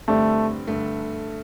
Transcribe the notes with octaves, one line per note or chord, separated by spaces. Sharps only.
G2 D3 A3 C4 G4 D5
G2 D3 A3